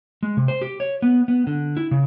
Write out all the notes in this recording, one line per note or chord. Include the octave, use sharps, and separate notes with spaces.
G#3
C3
C5
G4
C#5
B3
B3
D3
E4
C#3